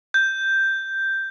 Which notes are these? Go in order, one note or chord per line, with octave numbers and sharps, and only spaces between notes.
G6